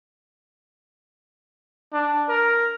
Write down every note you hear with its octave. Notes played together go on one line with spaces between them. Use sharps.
D4
A#4